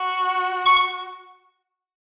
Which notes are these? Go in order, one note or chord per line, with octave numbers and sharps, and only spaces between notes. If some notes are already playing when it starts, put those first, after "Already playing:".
Already playing: F#4
C#6